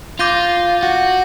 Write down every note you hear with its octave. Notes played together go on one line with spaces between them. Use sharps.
F4 D6 G6 A#6 D#7 G7
F#4